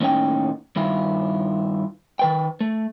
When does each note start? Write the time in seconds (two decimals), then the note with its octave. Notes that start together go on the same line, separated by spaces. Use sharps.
0.01 D#2 A2 C#4 D#4 G5
0.76 G2 D#3 E4 F4
2.19 D#3 B4 G5
2.61 A3